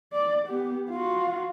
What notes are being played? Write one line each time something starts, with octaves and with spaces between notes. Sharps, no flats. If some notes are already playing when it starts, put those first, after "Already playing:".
D5
B3 G4
F4 F#4